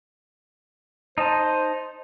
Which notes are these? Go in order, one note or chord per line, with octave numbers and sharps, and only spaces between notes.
D#4 C5 D#5 A5